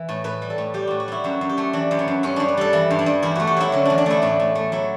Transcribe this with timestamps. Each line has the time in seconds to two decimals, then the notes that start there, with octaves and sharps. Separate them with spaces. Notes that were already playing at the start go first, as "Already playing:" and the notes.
Already playing: E3
0.09 A2
0.24 A2 B4
0.42 G3
0.50 A4
0.58 A2
0.74 G3 G4
0.87 A2 F#4
1.00 F#4
1.08 G3 E4
1.24 F#2 F#4
1.41 F#2
1.49 G4
1.58 A3
1.73 E3 D4
1.91 F#2
1.99 B3
2.08 F#2
2.23 G2 C#4
2.36 G2 D4
2.48 B4
2.57 G3 A4
2.73 E3 E4
2.90 G2
2.99 D4
3.06 G2
3.22 E2 E4
3.35 A3 F#4
3.47 G4
3.57 F#3 E4
3.72 D3 C#4
3.85 E2 D4
3.98 D4
4.06 A3 E4
4.22 A2 D4
4.40 A2
4.55 A3
4.72 F#3 E4